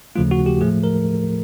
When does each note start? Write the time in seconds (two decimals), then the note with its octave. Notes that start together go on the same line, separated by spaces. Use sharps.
0.15 D#2 C#3 F3 A3 F4
0.31 F#4
0.46 G4
0.61 A2 F3 A3 G#4
0.84 A#4